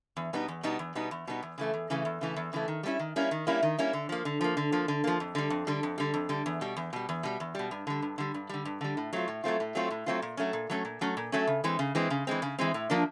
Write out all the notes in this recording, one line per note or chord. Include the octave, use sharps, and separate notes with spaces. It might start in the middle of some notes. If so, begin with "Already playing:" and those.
E2
B2 G3 B3 D#4
E2
B2 G3 B3 D#4
E2
B2 G3 B3 D#4
E2
B2 G3 B3 D#4
E2
C#3 E3 A3
E2
C#3 E3 A3
E2
C#3 E3 A3
E2
C#3 E3 A3
D#3
G3 A#3 C#4 E4
D#3
G3 A#3 C#4 E4
D#3
G3 A#3 C#4 E4
D#3
G3 A#3 C#4 E4
D3
F3 A#3
D3
F3 A#3
D3
F3 A#3
D3
F3 A#3
F2
D3 G3
F2
D3 G3
F2
D3 G3
F2
D3 G3
E2
B2 G3
E2
B2 G3
E2
B2 G3
E2
B2 G3
G2
D3 G3
G2
D3 G3
G2
D3 G3
G2
D3 G3
A2
F#3 A3 C4 F4
A2
F#3 A3 C4 F4
A2
F#3 A3 C4 F4
A2
F#3 A3 C4 F4
A#2
F#3 A3 C#4
A#2
F#3 A3 C#4
A#2
F#3 A3 C#4
A#2
F#3 A3 C#4
C#3
E3 G#3 C4
C#3
E3 G#3 C4
C#3
E3 G#3 C4
C#3
E3 G#3 C4
A2
F3 A#3 D4